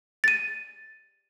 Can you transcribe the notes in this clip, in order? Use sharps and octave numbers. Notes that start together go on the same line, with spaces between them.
A6 D#7